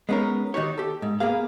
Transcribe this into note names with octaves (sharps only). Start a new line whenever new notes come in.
G#3 B3 C#4 D#4 A#4
D#3 D#4 F#4 G4 C#5
G4 A4
G#2
A#3 B3 G#4 F5